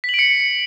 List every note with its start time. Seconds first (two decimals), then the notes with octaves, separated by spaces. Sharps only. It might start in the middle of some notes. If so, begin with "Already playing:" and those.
0.04 B6
0.09 F#7
0.14 D7
0.19 C#7